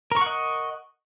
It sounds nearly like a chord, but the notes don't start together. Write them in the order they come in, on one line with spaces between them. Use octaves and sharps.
A#4 C#6 F#5 D#5